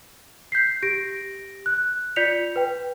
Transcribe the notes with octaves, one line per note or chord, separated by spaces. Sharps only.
G6 B6 C7
G4 A#6 D7
F#6
F4 D5 G6 B6 C#7 F7
B4 G5